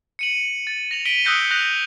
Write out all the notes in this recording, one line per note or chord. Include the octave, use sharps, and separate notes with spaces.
C#7 D#7 F#7
A6
A#6 F7 F#7
B6 D7 D#7 F#7 G7
D#6 E6 F#6 G6 A#6 C#7
F#6 G6 A#6 F7 F#7